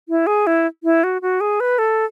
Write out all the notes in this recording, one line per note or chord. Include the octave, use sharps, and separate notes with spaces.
E4
G#4
E4
E4
F#4
F#4
G#4
B4
A4